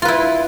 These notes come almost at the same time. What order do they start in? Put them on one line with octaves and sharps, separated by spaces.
F4 B4 E4